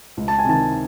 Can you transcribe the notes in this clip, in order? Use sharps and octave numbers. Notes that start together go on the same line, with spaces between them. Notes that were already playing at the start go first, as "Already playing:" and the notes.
C#2
A5
G#5
C3 D#3 A5